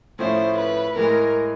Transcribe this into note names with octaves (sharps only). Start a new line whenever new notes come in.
A2 F3 A3 C#4 E4 C5
B4
A2 E3 G#3 A#4